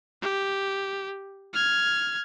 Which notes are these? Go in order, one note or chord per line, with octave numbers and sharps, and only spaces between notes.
G4
F6 G#6